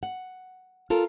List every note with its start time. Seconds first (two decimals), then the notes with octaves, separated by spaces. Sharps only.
0.03 F#5
0.90 F4 A4 A#4